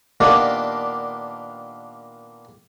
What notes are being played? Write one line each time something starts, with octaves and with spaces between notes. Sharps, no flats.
A#2 D#3 A#3 B3 D4 G4